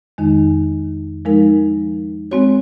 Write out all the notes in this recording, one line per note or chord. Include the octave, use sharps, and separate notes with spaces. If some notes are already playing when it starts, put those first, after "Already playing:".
F2 D#3 G#3 D#4
F3 G#3 D#4 A#4
G#3 C4 F#4 C#5